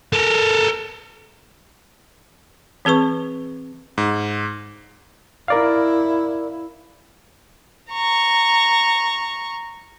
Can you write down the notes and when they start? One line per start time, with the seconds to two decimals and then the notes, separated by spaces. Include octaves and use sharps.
0.13 A4 A#4
2.85 E3 C4 G#4 B4 C#6
3.98 G#2
5.48 E4 A#4 D5 F5
7.91 A#5 C#6